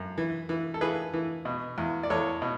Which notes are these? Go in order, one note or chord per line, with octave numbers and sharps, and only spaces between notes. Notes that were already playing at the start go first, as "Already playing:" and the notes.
Already playing: F#2
E3
E3
A4
E3 G#4 B4
E3
B2
E2
D5
E2 A4 C#5
B2